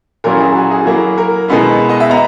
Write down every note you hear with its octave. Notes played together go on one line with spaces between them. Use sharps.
A#2 F#3 C#4 E4 A#4
G#4
F#4
G#4
F#3 A#3 E4
A#4
B2 G#3 B3 E4
D#5
E5
B3 A#5